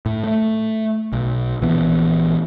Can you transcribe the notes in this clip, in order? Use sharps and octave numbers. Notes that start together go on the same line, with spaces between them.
A2
A3
B1
A#1 E3 B3